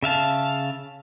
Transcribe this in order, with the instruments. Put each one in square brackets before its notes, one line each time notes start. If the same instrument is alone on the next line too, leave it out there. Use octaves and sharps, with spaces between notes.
[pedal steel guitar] C#3 E5 F5 A5